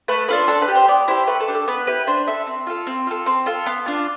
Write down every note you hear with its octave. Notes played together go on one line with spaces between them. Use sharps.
A3 B4
D4 F4 A4 B4
D4 A4
B4
G4
C5
B3 D5
E4 G4 C5
A3 B4
A4
D4 G4
A4
B3 B4
E4 G4 B4
D4 C5
A4 E5
C4
F4 A4
C4
F4 A4
C4
F4 A4
B3 C6
D4 F4